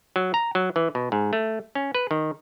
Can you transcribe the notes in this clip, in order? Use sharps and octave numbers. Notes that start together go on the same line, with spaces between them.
F#3
A#5
F#3
E3
B2
G#2
A3
C#4
B4
D#3